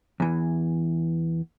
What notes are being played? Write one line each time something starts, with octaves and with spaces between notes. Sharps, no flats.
E2 E3